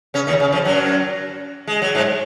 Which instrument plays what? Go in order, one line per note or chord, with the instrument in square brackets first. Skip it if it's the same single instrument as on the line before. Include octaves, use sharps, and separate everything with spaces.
[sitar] C#3 C#4
D#2 D#3
C#3
F2 F3
F#2 F#3
G#3
F#3
G#2 G#3